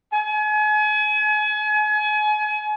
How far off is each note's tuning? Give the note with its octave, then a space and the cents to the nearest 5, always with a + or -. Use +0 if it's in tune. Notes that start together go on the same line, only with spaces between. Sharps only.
G#5 +35